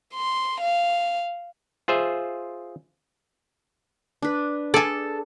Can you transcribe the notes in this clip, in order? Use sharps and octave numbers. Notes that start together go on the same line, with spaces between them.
C6
F5
F4 G#4 C5 E5
D4 B4
G#4 A4 D5